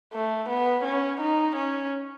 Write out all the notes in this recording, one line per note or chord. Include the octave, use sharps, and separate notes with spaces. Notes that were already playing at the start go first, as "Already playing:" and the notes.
A3
B3
C#4
D#4
C#4